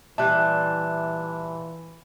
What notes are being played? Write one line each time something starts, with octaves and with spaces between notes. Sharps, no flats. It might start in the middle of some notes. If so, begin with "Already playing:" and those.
A#2 E3 G3 E5 A5 F#6